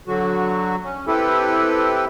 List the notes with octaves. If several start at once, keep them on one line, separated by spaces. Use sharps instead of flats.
D3 F#3 F#4
C#4
C4 E4 G4 A4 B4